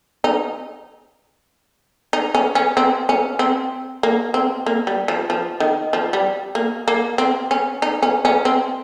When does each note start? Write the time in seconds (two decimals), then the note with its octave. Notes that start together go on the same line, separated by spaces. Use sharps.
0.24 D#4
2.13 D#4
2.35 C#4
2.55 C#4
2.77 C4
3.09 C#4
3.39 C4
4.03 A#3
4.34 C4
4.66 A#3
4.87 G3
5.08 F3
5.30 F3
5.60 D#3
5.93 F3
6.13 G3
6.55 A#3
6.88 A#3
7.18 C4
7.51 C#4
7.82 D#4
8.03 C#4
8.25 C#4
8.45 C4